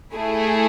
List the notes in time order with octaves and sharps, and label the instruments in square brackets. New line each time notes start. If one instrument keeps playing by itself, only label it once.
[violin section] A3 E4 G#4